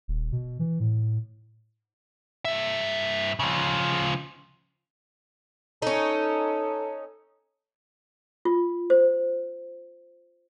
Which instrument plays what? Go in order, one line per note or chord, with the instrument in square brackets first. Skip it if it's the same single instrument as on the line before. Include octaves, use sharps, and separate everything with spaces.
[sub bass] D#1
B2
E3
A2
[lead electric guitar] G2 E5
C#3 F3
[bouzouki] C#4 D#4 [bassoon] A4
[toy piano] F4
C5